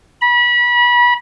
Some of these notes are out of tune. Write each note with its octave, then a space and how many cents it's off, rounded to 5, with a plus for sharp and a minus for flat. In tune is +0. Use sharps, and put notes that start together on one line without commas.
B5 -30